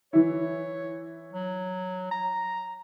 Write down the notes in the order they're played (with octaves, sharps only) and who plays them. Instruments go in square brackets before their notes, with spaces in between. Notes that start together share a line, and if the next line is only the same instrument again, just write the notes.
[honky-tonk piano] E3 E4 [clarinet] C#5
[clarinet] F#3
A#5